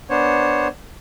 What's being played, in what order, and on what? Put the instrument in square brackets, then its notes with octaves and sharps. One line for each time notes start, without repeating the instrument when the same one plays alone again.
[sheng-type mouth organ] B3 D4 C5 C#5